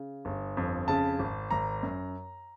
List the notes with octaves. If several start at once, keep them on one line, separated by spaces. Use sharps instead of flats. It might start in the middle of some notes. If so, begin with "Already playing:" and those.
Already playing: C#3
G1
F2
C#3 A5
G#1
G#1 A#5
F#2